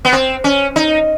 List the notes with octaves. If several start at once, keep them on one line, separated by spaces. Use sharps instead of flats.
B3
C4
C#4
D#4